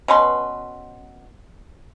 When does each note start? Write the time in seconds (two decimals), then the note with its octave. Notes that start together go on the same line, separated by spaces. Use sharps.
0.08 B2 C#4 B4 C6